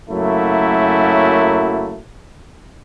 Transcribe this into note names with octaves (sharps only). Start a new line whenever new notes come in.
F#2 C#3 F#3 A3 A#3 E4